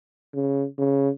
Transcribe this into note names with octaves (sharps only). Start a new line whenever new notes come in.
C#3
C#3